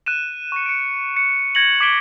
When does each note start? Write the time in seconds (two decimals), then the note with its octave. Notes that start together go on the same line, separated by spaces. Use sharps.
0.06 F#6 D#7 E7
0.52 C#6 C#7
0.66 C#7 D7
1.17 C#7
1.55 G#6 A#6 C#7 F#7
1.81 D6 G#6 B6 C#7 D7 G7